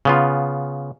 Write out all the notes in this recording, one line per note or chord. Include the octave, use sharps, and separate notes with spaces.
C#3 B3 F4